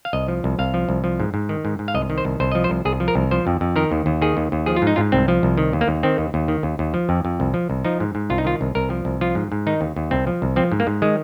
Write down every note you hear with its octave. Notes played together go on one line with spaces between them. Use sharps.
F5
C2 D#5
F3
C2
C2 F5
F3
C2
F3
G#2
G#2
D#3
G#2
G#2
F5
C2 D#5
D#3
C5
C2
C2 C5
F3 D#5
C5
C2
C2 G#4
F3
A#4
C2
F3 C5
F2
F2
D#3 A#4
D#2
D#2
D#3 G#4
D#2
D#2
F3 G#4
F4
G#2 D#4
G#2 F4
C2 C4
F3
C2
D#3
D#2
A#3
D#2
D#3 C4
D#2
D#2
D#3
D#2
D#2
F3
F2
F2
C2
F3
C2
F3 D#4
G#2
G#2
C2 F4
D#4
D#3 F4
C2
C2 A#4
F3
C2
F3 F4
G#2
G#2
D#3 D#4
D#2
D#2
C2 C4
F3
C2
F3 C4
G#2
A#3
G#2
D#3 G#3